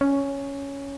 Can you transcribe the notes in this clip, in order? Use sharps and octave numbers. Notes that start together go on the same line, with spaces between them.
C#4